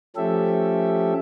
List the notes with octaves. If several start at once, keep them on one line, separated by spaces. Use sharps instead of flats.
F3 A3 C#4 G4 A4 E5